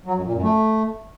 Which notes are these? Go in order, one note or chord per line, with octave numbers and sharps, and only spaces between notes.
F#3
F#2
A#2
F#2
A3